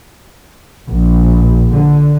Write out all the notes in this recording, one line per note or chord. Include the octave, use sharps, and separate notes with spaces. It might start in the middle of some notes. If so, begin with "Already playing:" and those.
A#1
D3